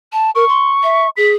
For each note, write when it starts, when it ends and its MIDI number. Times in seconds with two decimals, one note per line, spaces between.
0.12 0.30 81
0.35 0.46 70
0.35 1.10 85
0.48 0.71 84
0.83 1.07 76
1.17 1.35 68
1.17 1.31 95